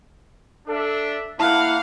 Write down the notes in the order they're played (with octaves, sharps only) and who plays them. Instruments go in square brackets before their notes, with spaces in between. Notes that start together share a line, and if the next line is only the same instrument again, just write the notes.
[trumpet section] D4 E5 [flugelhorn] A4
[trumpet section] A#3 F#5 [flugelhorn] E4 [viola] F5 [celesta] A5